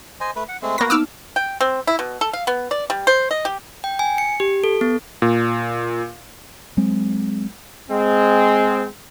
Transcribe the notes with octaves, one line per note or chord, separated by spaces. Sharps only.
C5 D#5 G#5
A3 B4
F#5
G#3 A3 C4
A#3 F#4 B4 A#6
B3 D#4 D6 E6 F6
G5
C4
E4
B2
A4
F5
B3
D5
G3
C5
D#5
G4
G5
G#5
C#7
G4
A4
B3
A#2
F#3 G#3 C4
G#3 C4